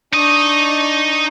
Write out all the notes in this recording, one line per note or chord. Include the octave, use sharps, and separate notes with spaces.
D4 D#4 D#5 C#6